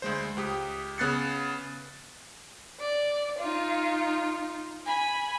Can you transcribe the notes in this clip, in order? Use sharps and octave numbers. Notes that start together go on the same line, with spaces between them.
D2 G#3 C5
C#2 G4 D#6
C#3 B3 F#6 A6 C7 C#7
D5
D#4 F4
G#5 B5